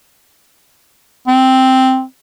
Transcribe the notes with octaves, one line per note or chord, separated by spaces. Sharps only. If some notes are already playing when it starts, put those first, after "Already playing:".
C4